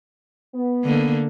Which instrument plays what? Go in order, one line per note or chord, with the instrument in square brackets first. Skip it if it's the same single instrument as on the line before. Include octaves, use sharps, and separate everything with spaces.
[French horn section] B3
[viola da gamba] D3 A#3